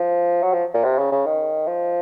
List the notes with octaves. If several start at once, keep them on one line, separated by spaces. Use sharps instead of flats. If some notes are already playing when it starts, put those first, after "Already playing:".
Already playing: F3
F#3
F3
A#2
C3
C#3
C#3
D#3
F3